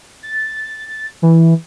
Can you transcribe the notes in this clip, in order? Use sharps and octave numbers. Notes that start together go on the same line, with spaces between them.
A6
E3